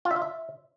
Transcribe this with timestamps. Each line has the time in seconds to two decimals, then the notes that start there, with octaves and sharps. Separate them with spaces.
0.05 F4
0.11 E5
0.16 F4
0.22 E5